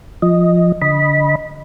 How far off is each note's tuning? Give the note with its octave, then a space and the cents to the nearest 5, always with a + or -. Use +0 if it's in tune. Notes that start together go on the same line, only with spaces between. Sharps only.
F3 +0 D#5 +0
D3 -25 D#5 +0 B5 -15